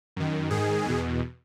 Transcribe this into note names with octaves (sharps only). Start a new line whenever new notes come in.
F#2 D#3
G#2 D#3 G#4
E2 B2